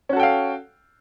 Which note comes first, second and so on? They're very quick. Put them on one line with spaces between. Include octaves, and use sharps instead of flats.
C#4 F#4 A4 G5 F5